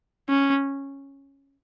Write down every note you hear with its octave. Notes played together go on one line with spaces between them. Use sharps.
C#4